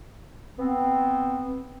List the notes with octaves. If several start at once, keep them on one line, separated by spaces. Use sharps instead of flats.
B3 C4